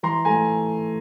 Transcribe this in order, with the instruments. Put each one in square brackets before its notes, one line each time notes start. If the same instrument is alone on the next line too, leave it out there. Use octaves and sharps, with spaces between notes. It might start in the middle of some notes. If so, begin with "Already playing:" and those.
[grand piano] E3 A#5 C6
A3 G#5 A#5